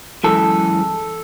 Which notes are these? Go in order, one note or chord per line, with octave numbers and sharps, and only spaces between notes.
F#2 E3 G#3 A4